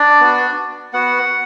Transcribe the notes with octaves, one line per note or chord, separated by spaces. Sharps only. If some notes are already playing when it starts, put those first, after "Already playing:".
Already playing: D4 D5
B3 F#4
B3 F#4 F#5